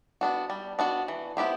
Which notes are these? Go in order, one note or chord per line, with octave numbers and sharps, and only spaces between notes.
B3 D4 F#4
G3
B3 D4 F#4
E3
B3 E4 G4 C5